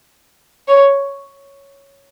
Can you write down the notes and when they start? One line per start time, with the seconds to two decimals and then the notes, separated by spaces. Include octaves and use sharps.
0.68 C#5